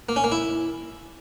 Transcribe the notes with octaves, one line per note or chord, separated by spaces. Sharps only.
A#3
C#4
A#3
E4